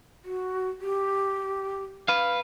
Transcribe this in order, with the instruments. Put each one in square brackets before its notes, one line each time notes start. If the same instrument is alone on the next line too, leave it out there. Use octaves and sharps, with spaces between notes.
[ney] F#4
G4
[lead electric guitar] B4 F5